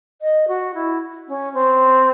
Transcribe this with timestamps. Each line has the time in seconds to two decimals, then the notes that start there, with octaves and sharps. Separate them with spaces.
0.22 D#5
0.48 F#4
0.74 E4
1.28 C#4
1.54 C4